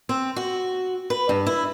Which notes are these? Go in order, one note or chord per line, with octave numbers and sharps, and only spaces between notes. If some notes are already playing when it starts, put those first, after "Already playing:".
C4
F#4
B4
G2
E4